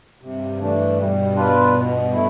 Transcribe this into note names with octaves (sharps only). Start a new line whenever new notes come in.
G2 C3
E3 A3 D4
B2 G3
D4 F4 B4
B2
A3 E4